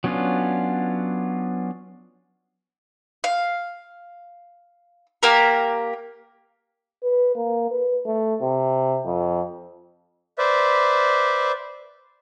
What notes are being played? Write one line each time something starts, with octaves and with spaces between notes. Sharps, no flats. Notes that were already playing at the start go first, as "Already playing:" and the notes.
F#3 B3 C#4 D4 F4
F5
A#3 G4 A#4
B4
A#3
B4
A3
C3
F2
B4 C5 D5 E5